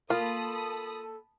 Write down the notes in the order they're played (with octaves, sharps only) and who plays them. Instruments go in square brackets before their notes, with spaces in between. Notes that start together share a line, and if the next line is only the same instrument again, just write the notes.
[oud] A#3 [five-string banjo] F4 [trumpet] A4 [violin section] A5 B5 D#6